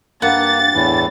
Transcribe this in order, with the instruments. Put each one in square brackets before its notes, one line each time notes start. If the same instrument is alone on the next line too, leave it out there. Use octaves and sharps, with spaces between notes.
[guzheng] G2 [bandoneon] A#3 [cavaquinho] F#5 [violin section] A6
[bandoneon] E2 A2 E3